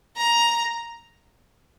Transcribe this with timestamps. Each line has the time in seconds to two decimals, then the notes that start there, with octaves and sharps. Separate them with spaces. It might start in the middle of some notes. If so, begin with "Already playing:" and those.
0.17 A#5